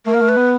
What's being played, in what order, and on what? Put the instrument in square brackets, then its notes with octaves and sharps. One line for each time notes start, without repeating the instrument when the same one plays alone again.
[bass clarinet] A3 [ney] A#4
[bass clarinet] A#3
A3
[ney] B4
[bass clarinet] B3